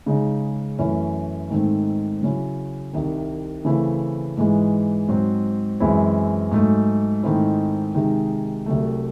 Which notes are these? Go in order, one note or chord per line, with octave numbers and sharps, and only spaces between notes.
C#3 G#3 D#4
F#2 E3 A3 C#4 E4
G#2 D#3 A3 C4 D#4
C#3 F#3 C#4 E4
C2 C3 D#3
C#3 E3 A3 C4 E4
G#2 E3 G#3
G#2 F#3 C4
F#2 E3 G#3 C4 E4
G#2 F#3 A3
G#2 D#3 A3 C4 E4
C3 D#3 G#3 D#4
C2 C3 F#3 A3